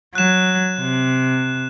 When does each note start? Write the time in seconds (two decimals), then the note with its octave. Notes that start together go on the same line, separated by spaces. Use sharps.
0.15 F#3 F#6 E7
0.80 C3